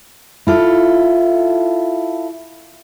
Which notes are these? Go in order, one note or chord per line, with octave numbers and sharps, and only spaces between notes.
E4 F4 A4